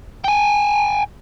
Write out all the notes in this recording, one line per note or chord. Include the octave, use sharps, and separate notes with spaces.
G5 G#5